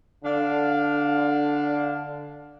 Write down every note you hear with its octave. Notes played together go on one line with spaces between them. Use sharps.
D3 D4 F5